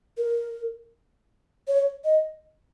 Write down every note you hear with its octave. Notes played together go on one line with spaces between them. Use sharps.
A#4
C#5
D#5